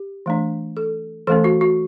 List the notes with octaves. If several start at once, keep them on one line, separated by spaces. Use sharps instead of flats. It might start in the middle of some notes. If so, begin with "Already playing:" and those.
Already playing: G4
E3 A3 D4
A4
E3 A3 C#4 A4
F#4
F#4